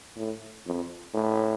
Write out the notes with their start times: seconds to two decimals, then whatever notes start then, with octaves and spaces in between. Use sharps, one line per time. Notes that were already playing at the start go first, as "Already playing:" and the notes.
0.17 A2
0.65 F2
1.14 A2